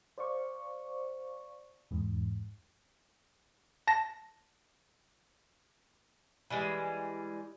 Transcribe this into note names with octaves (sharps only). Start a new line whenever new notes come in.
C5 D5 F5 C#6
E2 G#2
A5 A#6
E3 G3 G#3